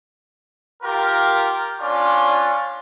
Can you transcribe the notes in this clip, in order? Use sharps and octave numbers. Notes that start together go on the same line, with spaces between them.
F4 G4 A#4
C#4 D4 F4 D5